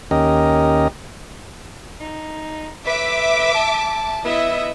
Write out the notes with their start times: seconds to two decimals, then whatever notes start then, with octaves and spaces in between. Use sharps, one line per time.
0.11 D#2 C#4 G4 A#4 D#5
2.01 D#4
2.87 B4 E5 D6
3.55 A5
4.25 B3 E4 D#5 E5